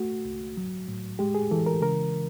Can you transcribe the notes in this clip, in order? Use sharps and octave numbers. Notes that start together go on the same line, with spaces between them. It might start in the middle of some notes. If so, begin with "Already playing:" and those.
Already playing: A3 F#4
C2
F#3
A2
G#3 G4
G#4
E3 A4
A#4
C#3 A#4